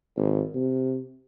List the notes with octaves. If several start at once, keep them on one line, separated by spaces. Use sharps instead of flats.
G#1
C3